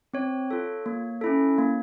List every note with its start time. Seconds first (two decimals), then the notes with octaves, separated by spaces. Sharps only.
0.14 C4 C#5
0.51 F4 A4
0.86 A#3
1.21 C#4 E4 A4
1.58 A#3